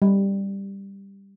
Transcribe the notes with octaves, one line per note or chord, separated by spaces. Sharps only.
G3